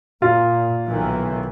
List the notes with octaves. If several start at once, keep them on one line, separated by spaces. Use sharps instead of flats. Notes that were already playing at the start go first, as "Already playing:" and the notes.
A#2 F4
B1 D#3 E3